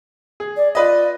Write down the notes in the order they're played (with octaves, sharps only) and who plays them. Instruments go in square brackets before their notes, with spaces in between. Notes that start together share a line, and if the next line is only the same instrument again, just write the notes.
[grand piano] G#4
[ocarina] D5
[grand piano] F4 B4 D#5 [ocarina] D5